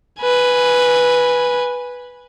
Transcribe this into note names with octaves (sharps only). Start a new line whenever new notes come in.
B4 G#5